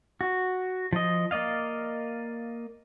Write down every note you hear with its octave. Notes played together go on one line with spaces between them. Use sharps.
F#4
F3 D#5
A#3 D5 D#5 F5